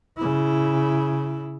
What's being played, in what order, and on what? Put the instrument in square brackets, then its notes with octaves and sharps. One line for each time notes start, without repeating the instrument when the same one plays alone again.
[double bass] C#3 E4